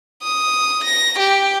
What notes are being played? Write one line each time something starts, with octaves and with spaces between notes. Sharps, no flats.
D#6
A#6
G4